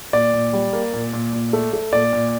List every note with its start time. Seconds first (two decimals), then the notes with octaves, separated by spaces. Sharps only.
0.13 A#2 D5
0.34 A#2
0.53 G3
0.73 A#3
0.93 A#2
1.13 A#2
1.33 A#2
1.53 A3
1.73 A3
1.92 A#2 D5
2.13 A#2